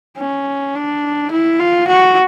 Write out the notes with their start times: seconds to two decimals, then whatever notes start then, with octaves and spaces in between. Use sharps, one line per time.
0.18 C#4
0.75 D4
1.32 E4
1.60 F4
1.88 F#4